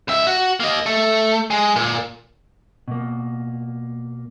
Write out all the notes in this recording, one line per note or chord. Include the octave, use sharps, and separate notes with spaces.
C#2 E5
F#4
A#3 D#5
A3
G#3
A#2
B2 A#3